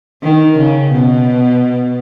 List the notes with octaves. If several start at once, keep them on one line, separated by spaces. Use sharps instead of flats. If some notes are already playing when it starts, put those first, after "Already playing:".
D#3
C#3
B2